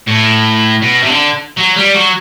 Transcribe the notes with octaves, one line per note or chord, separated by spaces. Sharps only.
A2
B2
C3
D3
F#3
G3
F#3